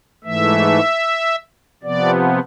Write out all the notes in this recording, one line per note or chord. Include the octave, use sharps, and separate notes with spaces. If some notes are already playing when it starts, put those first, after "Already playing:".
G#2 E3 A3 E5
C3 F3 B3 D5